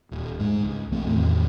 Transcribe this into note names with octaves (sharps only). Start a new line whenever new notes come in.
D#1
G#2 G#3
C#2
B1 E3 A3 C4
E2 A2 D#3